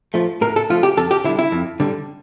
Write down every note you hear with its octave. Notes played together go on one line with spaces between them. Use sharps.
F3 A3
A2 A#4
A4
F3 A3 F4
G4
F2 A4
G4
D3 G3 E4
E4
F2
D3 G3